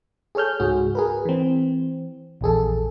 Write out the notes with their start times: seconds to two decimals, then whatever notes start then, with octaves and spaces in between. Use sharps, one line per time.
0.35 G#4 A4 C#5 F6 G6
0.60 C#2 G#2 F#4 G#4
0.95 G#4 A#4 B4
1.25 E3 C4
2.41 A#1 E2 G#4 A4